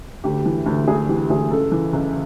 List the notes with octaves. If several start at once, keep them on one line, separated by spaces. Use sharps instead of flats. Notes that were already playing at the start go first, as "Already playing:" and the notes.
D2 G4
E3
D2
D2 G#4
E3 G4
D2 G#4
C#2 A4
E3
C#2